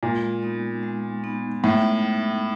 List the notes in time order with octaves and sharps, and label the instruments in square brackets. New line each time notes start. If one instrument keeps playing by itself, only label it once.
[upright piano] A#2 [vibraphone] G#3
[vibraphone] B3 D#4
G#3
B3 D#4
[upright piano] A2 [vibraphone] G#3
[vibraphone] B3 D#4